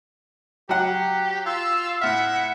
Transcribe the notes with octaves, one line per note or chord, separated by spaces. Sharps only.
F#3 G4 F#5
F4 E6
A2 E5 F#5 F6